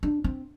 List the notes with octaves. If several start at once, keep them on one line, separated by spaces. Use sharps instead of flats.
D4
C4